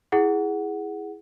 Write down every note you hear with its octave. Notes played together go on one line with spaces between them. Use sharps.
E4 G#4 F#5